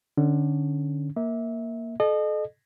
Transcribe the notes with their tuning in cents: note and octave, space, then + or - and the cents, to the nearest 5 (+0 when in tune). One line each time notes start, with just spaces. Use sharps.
D3 +15 C#4 +0
A#3 +0 E5 -25
A4 -35 D#5 -35